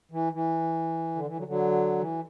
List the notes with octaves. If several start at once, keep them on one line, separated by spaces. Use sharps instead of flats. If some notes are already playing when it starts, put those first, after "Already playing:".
E3
E3
D3
E3
D3 F#3
D3 F#3
E3